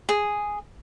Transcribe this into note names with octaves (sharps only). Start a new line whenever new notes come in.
G#4